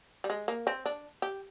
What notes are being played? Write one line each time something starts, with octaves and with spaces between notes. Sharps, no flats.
G3
G#3
A#3
C4
D4
G4